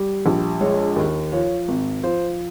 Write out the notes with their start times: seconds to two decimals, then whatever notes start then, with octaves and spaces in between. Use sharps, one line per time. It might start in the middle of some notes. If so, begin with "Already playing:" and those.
Already playing: G3
0.26 A#1
0.61 G#3 C#5
0.96 D#2
1.32 F3 C#5
1.68 G#1
2.03 F3 C5